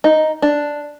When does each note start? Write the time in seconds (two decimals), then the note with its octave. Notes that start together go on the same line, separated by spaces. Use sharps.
0.04 D#4
0.42 D4